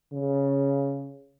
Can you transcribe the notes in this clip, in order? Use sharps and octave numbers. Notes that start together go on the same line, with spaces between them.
C#3